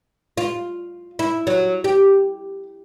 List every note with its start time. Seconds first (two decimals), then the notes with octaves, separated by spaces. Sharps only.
0.38 F4
1.19 E4
1.47 F#3
1.84 G4